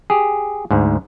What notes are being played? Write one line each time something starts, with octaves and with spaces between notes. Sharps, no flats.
G4 G#4
D2 G#2